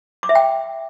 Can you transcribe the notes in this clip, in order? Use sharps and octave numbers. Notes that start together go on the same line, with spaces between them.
D6
E5
G5